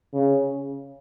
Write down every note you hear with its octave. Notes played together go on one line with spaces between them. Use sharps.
C#3